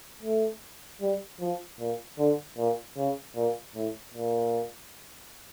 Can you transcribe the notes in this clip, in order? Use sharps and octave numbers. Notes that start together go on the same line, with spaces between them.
A3
G3
F3
A#2
D3
A#2
C#3
A#2
A2
A#2